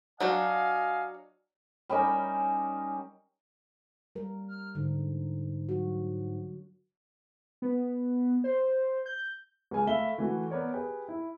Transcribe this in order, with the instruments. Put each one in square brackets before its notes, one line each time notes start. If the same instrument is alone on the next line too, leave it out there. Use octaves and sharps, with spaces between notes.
[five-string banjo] F#3 D4 F#4 [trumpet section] D#5 F5 G#5
[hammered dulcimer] G3 C#4 D#4 A#4
[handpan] G3 A#4
[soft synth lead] F6
[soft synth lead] G#2 [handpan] D3
[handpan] F#3 F#4
[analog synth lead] B3
C5
G6
[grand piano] C#2 G#4 G#5 F6
A3 E5 F5 B5 G7
E3 A3 F#4
B3 A#4 C#5 D5
G4 G#4 B4 G5
E4